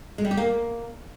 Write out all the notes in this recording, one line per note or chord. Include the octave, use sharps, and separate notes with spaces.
G#3
G3
G4
A#3